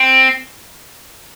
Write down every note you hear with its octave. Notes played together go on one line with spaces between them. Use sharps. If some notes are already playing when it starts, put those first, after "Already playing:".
Already playing: C4